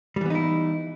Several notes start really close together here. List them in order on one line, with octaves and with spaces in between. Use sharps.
G3 E3 B3 D#4 E4